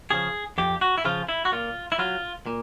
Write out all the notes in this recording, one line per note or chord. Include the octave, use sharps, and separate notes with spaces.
C#3 F3 G#4
F2 G4
F#4
E4
C#3 F3 F4
E4
F#4
A#2 F4
E4
F#3 F4
A#2